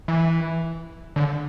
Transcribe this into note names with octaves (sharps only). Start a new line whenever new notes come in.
E3
D3